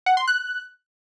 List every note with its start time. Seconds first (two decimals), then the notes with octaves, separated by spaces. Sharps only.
0.06 F#5
0.17 C6
0.28 F#6